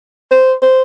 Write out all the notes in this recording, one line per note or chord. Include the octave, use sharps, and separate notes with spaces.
C5
C5